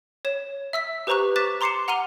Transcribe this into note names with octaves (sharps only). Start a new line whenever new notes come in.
C#5 E7
E5 E6 B6
G4 B4 C5 A#5 C#6 F#6
D6 F#6 A6 B6 E7
A#5 C6 D6 C7 C#7 E7
F#5 A#5 F6 D#7 F7 G7